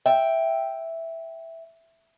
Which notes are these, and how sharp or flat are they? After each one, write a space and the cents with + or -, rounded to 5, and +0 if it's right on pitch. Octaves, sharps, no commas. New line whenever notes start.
E5 +0 G5 +0